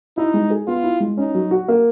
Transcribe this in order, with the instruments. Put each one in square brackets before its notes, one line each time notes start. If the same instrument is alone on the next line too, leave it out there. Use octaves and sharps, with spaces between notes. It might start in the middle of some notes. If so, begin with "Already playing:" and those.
[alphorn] D#4 [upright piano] E4
[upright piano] G#3
G#4
[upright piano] B3 [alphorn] F4
[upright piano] E4
G#3
[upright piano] C#4 [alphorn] D#4
[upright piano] F#3
F#4
A#3